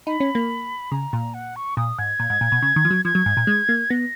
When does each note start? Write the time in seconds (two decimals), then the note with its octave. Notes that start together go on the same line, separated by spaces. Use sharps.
0.07 D#4 B5
0.20 C#4
0.35 A#3
0.91 C#3 A#5
1.13 A#2
1.34 F#5
1.56 C#6
1.77 A#2 D#6
1.98 G#2 G#6
2.20 A#2
2.30 G#2
2.41 A#2
2.52 B2
2.62 C#3
2.76 D#3
2.85 F3
2.90 F#3
3.05 F3 G#6
3.15 F#3
3.26 G#2
3.37 A#2
3.47 G#3
3.69 A#3
3.90 B3 A#6